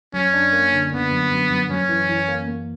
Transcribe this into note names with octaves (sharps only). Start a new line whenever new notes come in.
F#2 C#4
D4
A#3
D3
D3 B3
F#2
F#2
F#2
F#2 C#4
E3
E3
A#3
A#3